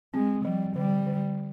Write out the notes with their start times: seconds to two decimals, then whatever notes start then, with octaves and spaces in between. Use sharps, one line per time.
0.14 G#3 C4
0.45 F3 G3
0.76 D3 G3
1.07 D3